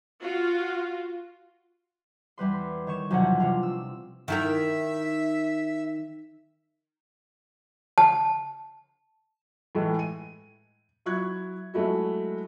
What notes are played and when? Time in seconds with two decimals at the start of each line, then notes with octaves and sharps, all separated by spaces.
0.23 F4 F#4
2.38 E2 G3 B4 C6
2.87 D#3 C#5 C#6 E7
3.10 B1 E2 C3 F3 D4 F#5
3.40 C3 F4
3.63 E6
4.28 D#3 E4 A#4 E5
7.98 A5
9.75 A2 E3 G#3 A3
9.99 D#7
11.06 F#3 E4 C#6 F#6 G#6
11.74 F#3 G#3 A3 E4 F#4